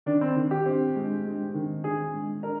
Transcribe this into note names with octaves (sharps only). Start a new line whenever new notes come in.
D#3 D4
C4
D#3
G4
C4
G#3
G#3
D#3
D#3 G#4
G#3
D4 A#4